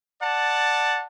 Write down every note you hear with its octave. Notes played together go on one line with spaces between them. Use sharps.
D5 F#5 A5